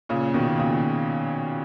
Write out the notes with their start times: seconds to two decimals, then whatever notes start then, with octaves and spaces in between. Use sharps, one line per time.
0.09 A#2 C#3
0.34 B2 D#3
0.59 A#2 C#3